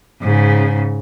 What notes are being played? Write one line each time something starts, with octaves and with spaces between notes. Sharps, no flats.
G#2 C#3